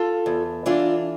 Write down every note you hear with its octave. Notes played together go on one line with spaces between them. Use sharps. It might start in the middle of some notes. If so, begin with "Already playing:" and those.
Already playing: F4 A4
E2
E3 D4 F4